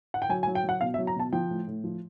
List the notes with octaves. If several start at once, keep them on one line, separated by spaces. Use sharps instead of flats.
F#5
G5
F#3 G#5
G#5
F#3
G5
F#3 F#5
B2 F5
E5
F#3
A#5
B2 A5
F3 G5
A2
A2
F3